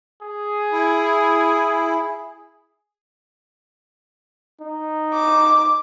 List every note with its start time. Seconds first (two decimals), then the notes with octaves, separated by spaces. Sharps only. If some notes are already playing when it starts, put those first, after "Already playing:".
0.22 G#4
0.72 E4
4.61 D#4
5.14 D6